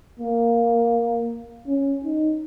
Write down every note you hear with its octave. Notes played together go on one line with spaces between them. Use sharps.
A#3
C#4
D#4